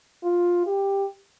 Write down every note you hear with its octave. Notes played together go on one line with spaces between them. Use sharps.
F4
G4